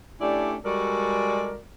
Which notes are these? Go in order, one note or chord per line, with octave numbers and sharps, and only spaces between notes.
A3 C#4 D4 E4 G4 D5
G3 G#3 F#4 A4 A#4 D5